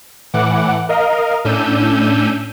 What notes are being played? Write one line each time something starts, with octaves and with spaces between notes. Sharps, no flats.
A2 E3 F#5 D6
A#4 D#5 F5
A2 C#4 D4 E6 G6 D#7